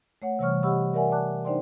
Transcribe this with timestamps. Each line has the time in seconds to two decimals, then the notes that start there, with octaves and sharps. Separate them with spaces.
0.22 A3 C#5 F#5
0.39 C3 E3 G3 C#5 C#6 F6
0.63 G4 D#5 F#5 B5 C#6 E6
0.94 A#4 D5 E5 F#5 G#5
1.11 D5 A5 D6 F#6
1.45 D4 D#4 C5 D5 G5 C6